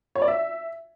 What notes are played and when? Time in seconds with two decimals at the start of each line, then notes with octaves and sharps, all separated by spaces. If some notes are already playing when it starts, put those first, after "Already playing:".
0.15 C#5
0.22 D5
0.28 E5